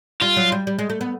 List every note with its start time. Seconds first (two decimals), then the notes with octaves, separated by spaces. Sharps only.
0.21 G3 F4
0.37 F#3
0.52 G3
0.67 G3
0.79 G#3
0.90 A3
1.01 B3